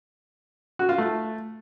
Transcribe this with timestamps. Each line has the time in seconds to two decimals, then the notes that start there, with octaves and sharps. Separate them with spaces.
0.79 F#4
0.89 F4
0.98 A3